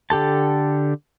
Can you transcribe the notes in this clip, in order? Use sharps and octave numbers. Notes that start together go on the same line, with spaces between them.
D3 G4 A4 A5